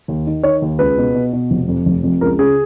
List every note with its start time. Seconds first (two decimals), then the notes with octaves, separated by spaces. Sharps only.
0.08 D#2
0.27 D#3
0.43 D#3 C#5
0.62 D#2
0.79 C#2 B4
0.98 B2
1.14 B2
1.33 B2
1.51 F1
1.68 F2
1.86 F1
2.04 F2
2.21 C#2 A#4
2.39 C#3 G#4